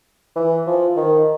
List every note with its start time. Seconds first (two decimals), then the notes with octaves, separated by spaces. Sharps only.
0.36 E3
0.67 F3
0.96 D#3